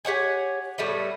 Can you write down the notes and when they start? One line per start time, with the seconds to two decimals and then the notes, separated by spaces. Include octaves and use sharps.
0.05 G4 C#5 F#5 G#5
0.78 A2 G3 A3 B3